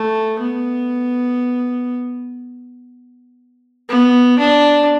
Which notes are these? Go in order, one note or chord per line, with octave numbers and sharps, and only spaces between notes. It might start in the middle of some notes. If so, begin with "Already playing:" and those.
Already playing: A3
B3
B3
D4